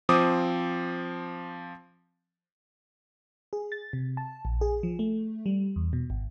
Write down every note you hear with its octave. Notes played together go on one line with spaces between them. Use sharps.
F3 C4 D6 D#6
G#4
A6
C3
A5
A#1
G#4
F3
A3
G3
E2
B2
G#1